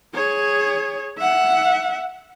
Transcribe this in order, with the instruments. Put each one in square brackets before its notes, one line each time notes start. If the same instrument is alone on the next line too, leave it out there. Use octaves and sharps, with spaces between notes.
[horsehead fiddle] G#4 C#5
E5 F#5